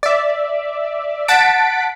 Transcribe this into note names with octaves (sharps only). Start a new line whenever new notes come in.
D5 E5
F#5 A5 A6 B6 D7